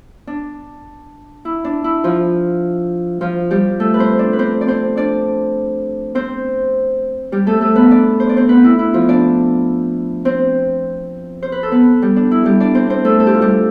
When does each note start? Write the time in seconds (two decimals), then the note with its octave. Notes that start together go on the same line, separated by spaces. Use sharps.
0.27 D4
1.45 E4
1.65 D4
1.84 E4
2.04 F3 F4
3.21 F3 F4
3.51 G3 G4
3.80 A3 A4
3.94 B4
3.99 C4 C5
4.19 D4 D5
4.33 B4
4.39 C4 C5
4.61 D5
4.68 C4 C5
4.97 D4 D5
6.15 C4 C5
7.32 G3 G4
7.47 A3 A4
7.61 A3 A4
7.75 B3 B4
7.91 D4 D5
8.20 C5
8.29 D5
8.37 C4 C5
8.49 B3 B4
8.64 E4
8.79 E4
8.94 F3 F4
9.09 D4 D5
10.25 C4 C5
11.43 C5
11.52 B4
11.63 A4
11.72 B3 B4
12.02 G3 G4
12.16 D4
12.31 E4
12.45 G3 G4
12.60 D4 D5
12.75 C4 C5
12.90 C4 C5
13.05 A3 A4
13.20 A4
13.27 G4
13.34 F4
13.41 G3 G4